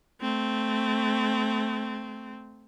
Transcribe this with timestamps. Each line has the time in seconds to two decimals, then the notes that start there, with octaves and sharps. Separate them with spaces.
0.21 A3 C4